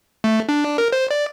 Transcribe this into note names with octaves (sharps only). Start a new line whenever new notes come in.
A3
D4
A#4
C5
D5